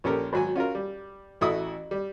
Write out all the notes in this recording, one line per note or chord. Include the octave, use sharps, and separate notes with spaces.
A#1 C#4 G4 A4 A#4
G#1 F#3 G#5
C#4 F4 F#4 A#4
G3
A1 E4 F#4 A4 D#6 E6
G3